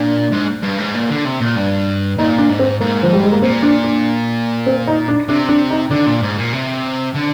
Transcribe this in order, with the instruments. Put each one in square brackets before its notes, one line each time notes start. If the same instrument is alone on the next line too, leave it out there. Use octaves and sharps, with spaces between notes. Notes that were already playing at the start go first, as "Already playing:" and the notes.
Already playing: [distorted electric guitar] A#2 [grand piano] D4
[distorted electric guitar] G#2
G2
G#2
A#2
D3
C3
A#2
G2
[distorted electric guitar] A#2 [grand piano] D#4
[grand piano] D4
[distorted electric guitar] G#2
[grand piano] C4
[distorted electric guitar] G#2 [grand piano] A#3
[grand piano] F3
G3
G#3
A#3
[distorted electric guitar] A#2 [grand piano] C4
[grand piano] D4
D4
C4
D#4
D4
[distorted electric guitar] C3 [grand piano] D4
[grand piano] D4
D#4
[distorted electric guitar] D3 [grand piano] D4
[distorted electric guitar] A#2
G#2
A#2
C3
D3